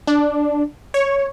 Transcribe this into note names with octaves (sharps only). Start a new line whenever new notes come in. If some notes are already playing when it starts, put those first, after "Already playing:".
D4
C#5